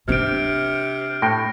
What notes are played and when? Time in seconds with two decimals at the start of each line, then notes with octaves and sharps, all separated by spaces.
0.08 C3 C4 D4 F6 D7
1.22 A2 G5 A#6